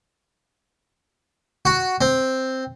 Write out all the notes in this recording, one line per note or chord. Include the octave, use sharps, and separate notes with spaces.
F#4
C4